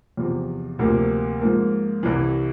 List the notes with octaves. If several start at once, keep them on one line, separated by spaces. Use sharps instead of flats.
E2 C3 F3
D2 C3 F3 A#3
G#2 F3 A#3
C2 C3 E3